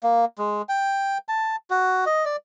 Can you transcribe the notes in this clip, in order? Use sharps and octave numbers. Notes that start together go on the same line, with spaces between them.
A#3
G#3
G5
A5
F#4
D#5
D5